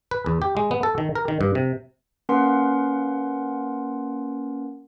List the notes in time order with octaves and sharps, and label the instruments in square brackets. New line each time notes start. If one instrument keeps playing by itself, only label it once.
[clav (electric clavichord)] B4
E2
G4
G#3
B3
A4
D#3
A#4
D#3
G2
C3
[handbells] A#3 C#4 A#4 B4 F#5 C6